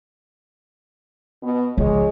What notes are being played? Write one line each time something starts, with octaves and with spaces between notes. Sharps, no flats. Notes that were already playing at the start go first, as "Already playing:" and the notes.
B2 B3
C#2 F3 G#3 C#5